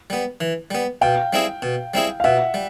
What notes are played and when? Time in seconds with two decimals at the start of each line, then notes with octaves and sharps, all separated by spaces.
0.10 G3 B3
0.41 E3
0.71 G3 B3
1.01 B2 F5 G5
1.33 G3 C4 E4 G#4
1.62 B2
1.94 G3 C4 E4 G#4
2.20 F5
2.24 B2 E5 F#5
2.54 G3